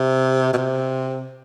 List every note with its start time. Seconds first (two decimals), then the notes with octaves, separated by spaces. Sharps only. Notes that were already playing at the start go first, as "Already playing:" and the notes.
Already playing: C3
0.53 B2
0.57 C3